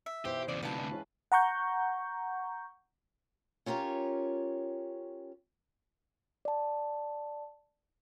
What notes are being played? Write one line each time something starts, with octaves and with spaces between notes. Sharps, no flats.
E5
B1 E3 B3 G4 C5
E2 C#3 D5
D2 C3 D#3 E3 F#3 B4 F5 A5
A2 D4 G#5
E3 G#3 C#4
F#5 A#5 C#6 G6
C#4 F4 G4 A#4 C#5
D5 A5